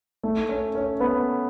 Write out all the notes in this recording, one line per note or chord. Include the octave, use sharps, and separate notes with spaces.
A3
C#4
C#4
B3